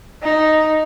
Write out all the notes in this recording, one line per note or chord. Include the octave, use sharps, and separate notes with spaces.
D#4